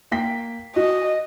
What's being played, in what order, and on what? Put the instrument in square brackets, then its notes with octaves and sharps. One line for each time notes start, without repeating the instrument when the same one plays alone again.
[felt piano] A#3 G5 B6
[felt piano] F#4 [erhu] D#5